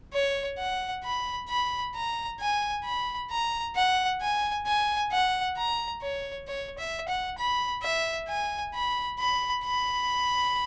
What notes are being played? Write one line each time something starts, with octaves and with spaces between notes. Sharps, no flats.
C#5
F#5
B5
B5
A#5
G#5
B5
A#5
F#5
G#5
G#5
F#5
A#5
C#5
C#5
E5
F#5
B5
E5
G#5
B5
B5
B5